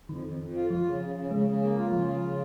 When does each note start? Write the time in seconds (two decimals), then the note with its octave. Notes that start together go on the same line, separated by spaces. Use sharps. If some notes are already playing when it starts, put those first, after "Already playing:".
0.09 F2 D#3
0.24 F2
0.39 F2
0.55 F4
0.70 F3 F4
0.85 C#3
1.01 C#3
1.16 C#3
1.31 C#3 G#3
1.47 C#3
1.62 A#3
1.78 F4
1.92 C#3 F3
2.08 F4
2.23 C#3